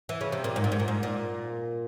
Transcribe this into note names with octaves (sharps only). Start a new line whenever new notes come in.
E3
C#3
C3
A#2
G#2
A#2
G#2
A#2
G#2
A#2